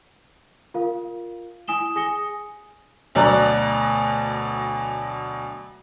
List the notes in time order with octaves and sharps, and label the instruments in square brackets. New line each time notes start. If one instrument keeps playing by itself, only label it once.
[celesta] F4 A#4 F5
E4 G#5 D#6 E7 G7
G#4 G#5 D#6 A#6 C#7 G7
[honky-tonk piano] D2 B2 F#3 D5 A#5 F#6